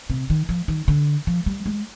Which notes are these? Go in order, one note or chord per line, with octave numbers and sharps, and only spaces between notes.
C3
D#3
F3
D#3
D3
F3
G3
G#3